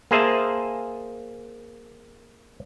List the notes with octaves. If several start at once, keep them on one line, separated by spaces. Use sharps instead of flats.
A#3 G#4 C5 E5 A5